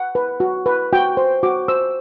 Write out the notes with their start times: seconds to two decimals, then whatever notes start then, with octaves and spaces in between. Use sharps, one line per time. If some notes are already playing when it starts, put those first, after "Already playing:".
Already playing: F#5
0.15 B4
0.40 F#4
0.66 B4
0.93 F#4 G5
1.17 C5
1.43 F#4 D6
1.68 C5 E6